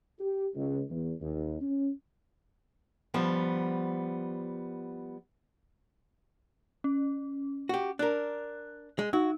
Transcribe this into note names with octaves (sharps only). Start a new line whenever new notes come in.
G4
C#2
E2
D#2
C#4
F3 G3 B3
C#4
F#4 G4
D4 A#4 F#6
G#3
D#4 F#4